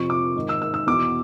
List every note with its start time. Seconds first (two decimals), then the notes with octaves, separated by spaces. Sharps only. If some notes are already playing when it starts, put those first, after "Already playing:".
Already playing: F2 C3 F3 C#6
0.10 D6
0.36 G#2 D#3
0.49 E6
0.62 E6
0.74 E6
0.87 E2 B2 D6